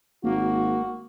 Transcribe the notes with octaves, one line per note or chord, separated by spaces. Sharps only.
G#1 A#3 F#4